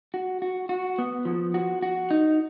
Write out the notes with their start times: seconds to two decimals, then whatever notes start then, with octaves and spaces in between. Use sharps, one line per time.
0.14 F#4
0.42 F#4
0.69 F#4
0.98 B3
1.25 F3
1.54 F#4
1.83 F#4
2.11 D#4